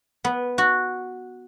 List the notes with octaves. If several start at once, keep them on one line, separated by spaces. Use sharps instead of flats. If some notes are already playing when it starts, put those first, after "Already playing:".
B3
F#4